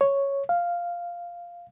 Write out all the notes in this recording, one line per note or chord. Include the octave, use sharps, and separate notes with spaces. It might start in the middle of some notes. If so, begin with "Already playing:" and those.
C#5
F5